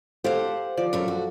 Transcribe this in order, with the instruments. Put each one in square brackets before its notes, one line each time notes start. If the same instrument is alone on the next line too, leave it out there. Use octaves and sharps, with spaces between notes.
[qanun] G4 A4 F5 [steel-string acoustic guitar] C5 F#5
[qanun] F3 D5
[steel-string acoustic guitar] F#2 A4 A#4
F#4